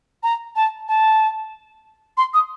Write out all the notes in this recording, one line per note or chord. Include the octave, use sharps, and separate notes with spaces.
A#5
A5
A5
C6
D#6